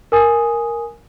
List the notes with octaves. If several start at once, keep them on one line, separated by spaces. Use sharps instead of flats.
A#4 G#5 D#6